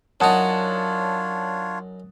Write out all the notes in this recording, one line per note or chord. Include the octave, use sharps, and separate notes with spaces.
F#2 D4 D#4 F4 C#5 F#5 A5 D#6